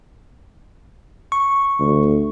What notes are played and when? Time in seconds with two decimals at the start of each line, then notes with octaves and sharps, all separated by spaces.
1.32 C#6
1.80 D2